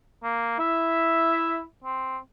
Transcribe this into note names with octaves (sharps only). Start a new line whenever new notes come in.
A#3
E4 E5
C4